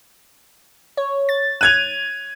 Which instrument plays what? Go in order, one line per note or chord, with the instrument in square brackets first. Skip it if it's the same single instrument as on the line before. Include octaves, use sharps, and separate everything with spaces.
[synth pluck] C#5
A6
[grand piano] F#6 G#6 F7 [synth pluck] D#7